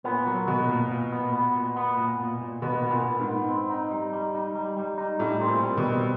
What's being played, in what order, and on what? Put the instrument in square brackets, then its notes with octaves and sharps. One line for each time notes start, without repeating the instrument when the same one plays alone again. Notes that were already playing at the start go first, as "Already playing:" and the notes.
[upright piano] A#2 [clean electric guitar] B3
[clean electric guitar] F#3
[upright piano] B2 [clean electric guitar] B3
[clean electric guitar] A#2
A#2
B3
B3
A#2
B3
A#2
A#2
A#2
[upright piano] B2 [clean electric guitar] B3
[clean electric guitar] B3
[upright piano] A#2
[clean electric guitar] B3
[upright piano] G#2
[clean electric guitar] B3
C4
D#4
G3
G3
D#4
G3
G3
D#4
[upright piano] A2 [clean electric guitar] G3
[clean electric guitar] C4
[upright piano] A#2
[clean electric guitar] G3
[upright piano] B2
[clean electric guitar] C4